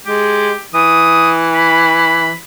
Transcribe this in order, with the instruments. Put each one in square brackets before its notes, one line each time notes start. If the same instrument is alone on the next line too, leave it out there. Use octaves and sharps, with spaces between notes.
[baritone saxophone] G#3 [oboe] G4
[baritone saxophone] E3 [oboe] D#6
[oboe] B5